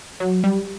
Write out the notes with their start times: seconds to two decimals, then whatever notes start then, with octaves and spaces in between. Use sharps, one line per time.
0.20 F#3
0.44 G3